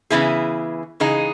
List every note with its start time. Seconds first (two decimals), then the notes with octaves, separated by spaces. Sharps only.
0.10 C#3 E3 B3 E4 G#4
1.00 C#3 E3 G#3 D#4 G#4